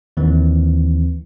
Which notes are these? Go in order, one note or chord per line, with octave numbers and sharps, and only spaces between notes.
D#2 D#3 E3 C4